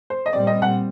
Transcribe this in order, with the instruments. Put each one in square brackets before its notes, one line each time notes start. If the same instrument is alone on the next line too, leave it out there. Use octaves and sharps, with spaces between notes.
[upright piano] C5
D#5
[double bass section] A#2 G3 C4 [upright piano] D5
[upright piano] D#5
F#5